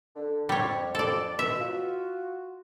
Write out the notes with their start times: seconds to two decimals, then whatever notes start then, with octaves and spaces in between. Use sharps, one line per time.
0.16 D3
0.49 F2 G3 C#5
0.95 A4 D5
1.39 B2 E5
1.60 F4 F#4